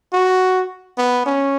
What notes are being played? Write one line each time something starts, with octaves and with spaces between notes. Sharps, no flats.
F#4
B3
C#4